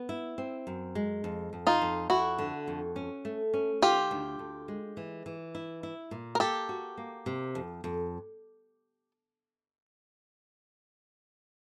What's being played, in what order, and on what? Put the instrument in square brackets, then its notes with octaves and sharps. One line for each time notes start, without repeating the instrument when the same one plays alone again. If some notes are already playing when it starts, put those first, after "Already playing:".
Already playing: [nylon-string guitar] B3
E4
C4
F#2
G#3
F2
F2
[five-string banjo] D#4 F4
[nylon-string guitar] F2
[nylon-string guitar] F2 [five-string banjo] E4 F#4
[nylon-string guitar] D3
F2
C#4
A3
C#4
[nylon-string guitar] D#3 [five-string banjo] F4 G4
[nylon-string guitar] D2
D2
G#3
E3
E3
E4
E4
A#2
[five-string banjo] A#4
[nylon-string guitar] A#3 [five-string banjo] G4 A4
[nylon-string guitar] F#4
A#3
C3
F2
F2